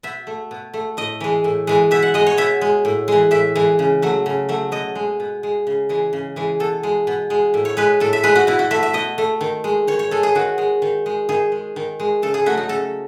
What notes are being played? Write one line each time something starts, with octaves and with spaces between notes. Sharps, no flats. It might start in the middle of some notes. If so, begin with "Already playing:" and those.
B2 E5
A3
B2
A3
A2 D#5
E3 G#3
A2
E3 G#3
B2 E5
F#5
G#3 D#5
C#5
B2 E5
G#3
A2
E3 G#3
A2 E5
E3 G#3
C#3
F#3 A3
C#3
F#3 A3
B2 D#5
G#3
B2
G#3
C#3
E3 G#3
C#3
E3 G#3
B2 A4
G#3
B2
G#3
A2
C#5
G#3 B4
A2 A4
E5
G#3 B4
F#4
B2 E4
F#4
A3 E5
E5
B2 D#5
A3
D#3
G#3
D#3 C#5
C#5
G#3 A4
G#4
D#3 F#4
G#3
D#3
G#3
D#3 G#4
G#3
D#3
G#3
C#3 A4
G#4
F#3 A3 F#4
D#4
C#3 A4